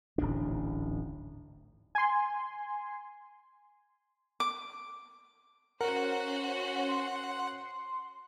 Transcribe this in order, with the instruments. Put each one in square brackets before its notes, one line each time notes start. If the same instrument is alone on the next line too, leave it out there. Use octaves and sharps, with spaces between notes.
[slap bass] D1 A1 G#2 D4
[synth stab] G#5 C6
[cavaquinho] D6
[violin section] C#4 F#4 C5 [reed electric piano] A#4 [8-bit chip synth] F#5
[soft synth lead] C6